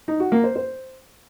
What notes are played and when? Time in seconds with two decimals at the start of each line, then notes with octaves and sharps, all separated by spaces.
0.08 D#4
0.20 F#4
0.32 A#3
0.44 C5
0.56 C5